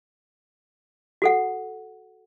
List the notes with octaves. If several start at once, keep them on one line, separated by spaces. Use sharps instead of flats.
F#4 A4 F#5